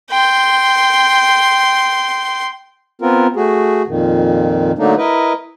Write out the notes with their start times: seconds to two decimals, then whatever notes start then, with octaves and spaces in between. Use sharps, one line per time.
0.11 G5 C6
3.02 B3 C4 F4 A#4
3.36 A3 F#4 G#4
3.88 F2 A#2 D#3
4.79 D3 F#3 A3 A#3 D4 D#4
4.98 E4 A#4 B4 D#5